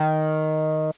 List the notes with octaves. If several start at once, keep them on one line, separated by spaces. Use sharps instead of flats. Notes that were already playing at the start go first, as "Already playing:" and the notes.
Already playing: D#3